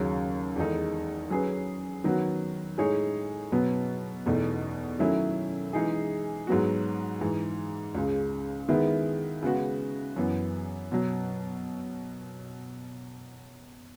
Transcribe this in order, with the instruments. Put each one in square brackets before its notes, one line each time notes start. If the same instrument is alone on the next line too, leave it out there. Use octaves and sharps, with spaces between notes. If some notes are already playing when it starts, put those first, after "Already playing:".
Already playing: [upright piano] D#2 C#3 F#3
E2 D#3 G#3 D#4 A4
F#3 C#4 G#4 B4
D#3 F#3 B3 F#4
A2 G#3 D#4 G#4 C#5
B2 F#3 B3
E2 B2 A3 D#4
D#3 F#3 A3 C#4 E4
E3 G#3 D#4 G#4
G#2 F#3 B3 F#4
G#2 E3 G#3
C#2 C#3 G#3
D#3 G#3 B3 E4
C#3 G#3 B3 F#4
F#2 E3 B3
B2 F#3